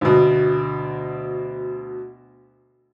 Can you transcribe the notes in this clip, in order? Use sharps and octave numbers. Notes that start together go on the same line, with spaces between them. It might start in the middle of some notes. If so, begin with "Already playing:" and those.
D2 B2